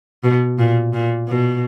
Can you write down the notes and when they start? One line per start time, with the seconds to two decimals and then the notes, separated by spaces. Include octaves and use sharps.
0.24 B2
0.59 A#2
0.93 A#2
1.28 B2